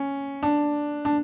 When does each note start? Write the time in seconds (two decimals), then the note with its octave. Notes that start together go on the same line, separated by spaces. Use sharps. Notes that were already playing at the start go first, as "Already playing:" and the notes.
Already playing: C#4
0.43 D4
1.05 D4